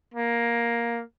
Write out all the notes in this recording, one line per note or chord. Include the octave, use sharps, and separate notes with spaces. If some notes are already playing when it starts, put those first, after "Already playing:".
A#3